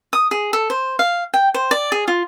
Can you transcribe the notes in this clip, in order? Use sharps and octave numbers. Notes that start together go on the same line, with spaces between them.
D#6
G#4
A4
C5
F5
G5
C5
D5
G#4
F4